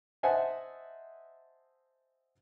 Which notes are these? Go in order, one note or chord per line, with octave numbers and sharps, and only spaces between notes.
C5 D#5 E5 F#5 G#5 A5